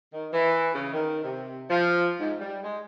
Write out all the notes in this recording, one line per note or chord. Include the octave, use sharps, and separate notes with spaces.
D#3
E3
C#3
D#3
C3
F3
G#2
G3
G#3